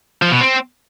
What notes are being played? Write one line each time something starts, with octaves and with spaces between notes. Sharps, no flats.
F3
B2
C4